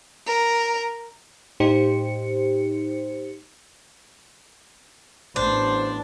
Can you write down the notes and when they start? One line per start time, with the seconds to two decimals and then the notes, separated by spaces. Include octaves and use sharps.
0.24 A#4
1.60 A2 D#4 G4 C5 C#7
5.36 A1 B3 D4 C5